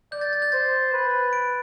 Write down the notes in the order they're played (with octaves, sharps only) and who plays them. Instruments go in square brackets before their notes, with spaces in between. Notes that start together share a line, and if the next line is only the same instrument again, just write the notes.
[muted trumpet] D5 [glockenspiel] G6
[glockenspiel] A6
A6
G6
[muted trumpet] C5 [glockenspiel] A6
[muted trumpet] B4
[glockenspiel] D7